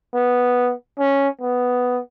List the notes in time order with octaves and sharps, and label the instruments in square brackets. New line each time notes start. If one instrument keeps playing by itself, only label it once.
[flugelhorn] B3
C#4
B3